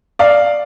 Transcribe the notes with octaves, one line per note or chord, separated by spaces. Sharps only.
D5 F5